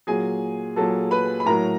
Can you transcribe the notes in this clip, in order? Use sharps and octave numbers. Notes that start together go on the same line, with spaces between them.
A#2 F#3 G#4 G#5
A#2 F#3 A4 A5
B4 B5
B5
A2 F#3 A#4 A#5